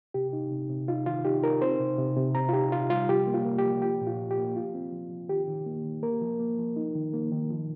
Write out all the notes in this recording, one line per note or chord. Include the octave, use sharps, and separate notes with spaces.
C3 G4
D#4
C3
C3
D#4 F4
D#3 F4
D#4 G4
D#4 A#4
C4 C5
C3
C3
C3
C3 A#5
F4
D#4 G4
C3 F4
G3 F4
F3 G4
A#3
F4
A#3
G4
F3
F3 G4
A#2
F4
A#2
G4
A#3
F3 F4
C4
F3
F3
D#3 G4
D#3
A#3
D#3
A#3 A#4
F3
A#3
F3
D#4
D#3
A#3
D#3
F3